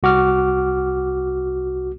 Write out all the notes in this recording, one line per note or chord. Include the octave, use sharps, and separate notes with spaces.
C2 F#4 D6 F6